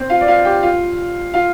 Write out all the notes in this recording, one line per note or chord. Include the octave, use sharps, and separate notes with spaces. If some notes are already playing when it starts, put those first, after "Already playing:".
Already playing: C4 C5
F4 F5
D5
F4 F5
G4 G5
F4 F5
F4 F5